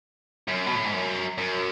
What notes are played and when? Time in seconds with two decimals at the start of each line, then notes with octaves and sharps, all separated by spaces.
0.48 F#2
0.67 B2
0.75 A2
0.85 G#2
0.93 F#2
1.38 F#2